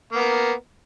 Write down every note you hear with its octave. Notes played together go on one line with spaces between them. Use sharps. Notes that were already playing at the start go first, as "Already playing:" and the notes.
A#3 B3 A#4